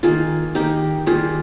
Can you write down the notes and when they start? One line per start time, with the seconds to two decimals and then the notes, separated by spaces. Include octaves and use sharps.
0.03 D#3 A#3 F4 G#4
0.55 D#3 A#3 D#4 G4
1.06 D#3 G3 A#3 F4 G#4